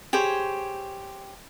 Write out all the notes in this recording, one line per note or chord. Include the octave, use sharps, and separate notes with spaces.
G4 G#4 C5 C#5